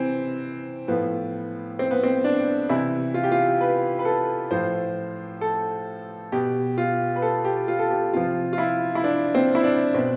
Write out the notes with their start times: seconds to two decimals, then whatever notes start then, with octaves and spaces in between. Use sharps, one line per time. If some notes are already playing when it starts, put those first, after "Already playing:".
Already playing: C3 E3 C4
0.88 A2 F3 B3
1.79 C4
1.91 B3
2.03 C4
2.24 D4
2.69 C3 E3 E4
3.14 F4
3.24 G4
3.32 F4
3.61 B4
3.99 B4
4.05 A4
4.51 A2 F3 C5
5.41 A4
6.32 B2 G4
6.78 F4
7.16 B4
7.22 A4
7.45 G4
7.68 F4
7.79 A4
7.91 G4
8.13 C3 F3 F4
8.53 F4
8.58 E4
8.95 E4
9.04 D4
9.35 C4
9.55 E4
9.64 D4
9.94 B2 C4